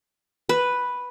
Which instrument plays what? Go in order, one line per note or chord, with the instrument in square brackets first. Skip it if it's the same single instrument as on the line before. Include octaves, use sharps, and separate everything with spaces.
[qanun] B4